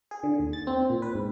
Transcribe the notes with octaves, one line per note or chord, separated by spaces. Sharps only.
G#4
D3
D#2
A6
C4
A#2
B4
G#2